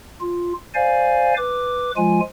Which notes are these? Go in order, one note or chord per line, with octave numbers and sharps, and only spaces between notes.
F4
C5 D5 F5 G#5
B4 D6
F3 G#3 F4 G#5